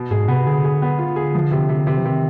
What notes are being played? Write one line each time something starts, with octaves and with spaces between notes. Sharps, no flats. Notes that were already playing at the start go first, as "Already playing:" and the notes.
Already playing: B2
G#2 G#4
C3 B3
D3 G#4
G#4
B3
F4
G#4
F3
C3
C3
C3
F3
C3 D#3